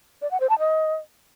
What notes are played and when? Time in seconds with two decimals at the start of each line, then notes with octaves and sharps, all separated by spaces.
0.22 D5
0.31 F#5
0.40 C5
0.50 A5
0.59 D#5